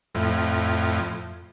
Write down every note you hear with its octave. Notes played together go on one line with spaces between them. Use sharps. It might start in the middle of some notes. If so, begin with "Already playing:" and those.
F2 A2